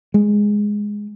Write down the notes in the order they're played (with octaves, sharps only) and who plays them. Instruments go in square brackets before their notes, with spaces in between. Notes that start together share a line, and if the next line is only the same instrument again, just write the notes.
[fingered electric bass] G#3